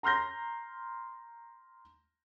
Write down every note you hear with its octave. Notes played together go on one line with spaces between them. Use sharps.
A#5 C6 F6 G6 A#6